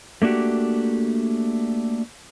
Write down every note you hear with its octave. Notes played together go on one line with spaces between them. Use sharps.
A3 A#3 D4 F#4 G4